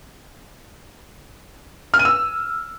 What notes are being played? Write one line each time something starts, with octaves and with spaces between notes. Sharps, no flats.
F6
D#7
E6